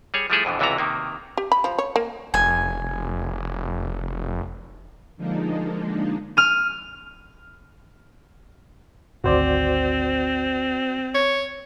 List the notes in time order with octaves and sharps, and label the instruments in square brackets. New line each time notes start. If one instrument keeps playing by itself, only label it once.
[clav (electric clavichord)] G3 G#4 C#5
F3 G3 A3 E4 G#4 A4
F2 B2 D3 E3
C#2 C3 E3 B3 F#4 A#5
C3 D#3 A#3
[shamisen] G4
B5
F3
C#5
A#3
[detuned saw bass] F1 [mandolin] G#5
[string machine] D3 F3 G#3 A#3 D4 D#4
[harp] F6 D#7
[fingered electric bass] G#1 D2 [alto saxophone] C4 [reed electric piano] F#4 C5 D5
[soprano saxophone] C#5